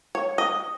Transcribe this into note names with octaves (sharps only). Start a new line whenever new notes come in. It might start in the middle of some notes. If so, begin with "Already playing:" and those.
C#5
D#5